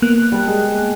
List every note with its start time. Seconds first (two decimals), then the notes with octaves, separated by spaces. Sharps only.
0.02 A#3 B3 F#6
0.32 G3 A5
0.47 G#3